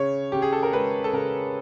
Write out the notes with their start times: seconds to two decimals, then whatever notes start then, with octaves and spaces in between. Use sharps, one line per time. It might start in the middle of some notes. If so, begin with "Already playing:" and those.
Already playing: C#3 C#5
0.32 C#3 G4
0.42 G#4
0.52 A4
0.63 A#4
0.73 G#3 B4
1.04 A4
1.13 C#3 A#4